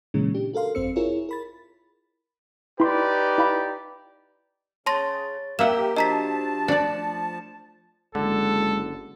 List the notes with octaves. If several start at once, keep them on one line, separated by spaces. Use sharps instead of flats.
A#2 C#3 E3 G#3 C#4
D4 G4
F#4 A4 A#4 F5 C6
G#1 F#2 C4 C5 E6 C#7
E4 F4 G#4 A#4 C#5
A#4 B5 A6
D#4 E4 G4 B4 D5 C6
E4 F5 B5
C#3 C#5 A5 C6 A6 A#6
A#3 G4 A#4 E5 F#5 A#5 D6 E7
F3 D4 F#4 G4 D#5 A5 A#5 B6
A3 D4 D5 C#7
F#1 D3 G#3 A4